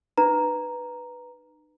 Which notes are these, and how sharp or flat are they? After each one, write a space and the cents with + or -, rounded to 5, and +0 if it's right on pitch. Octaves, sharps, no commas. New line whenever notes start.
D#4 -40 B4 +0 A#5 +0